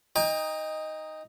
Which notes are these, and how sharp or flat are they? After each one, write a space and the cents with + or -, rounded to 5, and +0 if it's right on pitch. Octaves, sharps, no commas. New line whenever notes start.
D#4 +0 G5 +35 A#5 +0